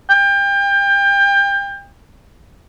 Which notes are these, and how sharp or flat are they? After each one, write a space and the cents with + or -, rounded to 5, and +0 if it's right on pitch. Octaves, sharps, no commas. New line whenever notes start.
G5 +30